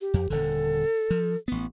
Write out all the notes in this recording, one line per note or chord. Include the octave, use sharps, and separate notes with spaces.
G4
F2
D#1 D3 A4
F3
A1 B3